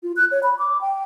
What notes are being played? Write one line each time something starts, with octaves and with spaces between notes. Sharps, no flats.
F4
F#6
C#5
B5
D6
G5